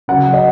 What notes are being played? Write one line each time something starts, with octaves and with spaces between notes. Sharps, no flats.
C#3 F#3 C#4 F#5
D#5